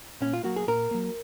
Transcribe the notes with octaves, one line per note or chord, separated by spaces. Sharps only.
A#2 C#4
F4
F#3 A#3 F#4
G#4
A#2 A#4
F#3 A#3